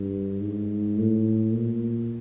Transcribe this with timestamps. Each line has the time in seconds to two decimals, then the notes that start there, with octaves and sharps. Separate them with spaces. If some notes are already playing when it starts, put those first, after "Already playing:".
Already playing: G2
0.40 G#2
0.97 A2
1.53 A#2